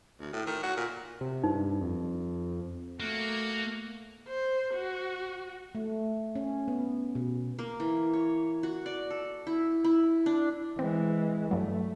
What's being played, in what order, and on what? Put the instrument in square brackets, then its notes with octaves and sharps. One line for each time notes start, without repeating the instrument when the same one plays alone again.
[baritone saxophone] D2
A2
D#3
F#4
A#2
[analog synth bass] C3
[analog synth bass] G2 [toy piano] D#4
[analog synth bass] F2
[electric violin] A3 [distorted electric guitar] A#3 [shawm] F#4
[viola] C5
F#4
[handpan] A3
C#4
B3
B2
[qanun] A#3
E3
C#5
F#4
D5
A4
E4
E4
D4
[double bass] E3 G#3 [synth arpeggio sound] C4
[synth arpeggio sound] G2 F#3 [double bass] A3